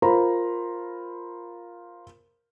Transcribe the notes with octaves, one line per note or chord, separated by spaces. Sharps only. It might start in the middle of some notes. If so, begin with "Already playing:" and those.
F4 A#4 C5 A#5 B5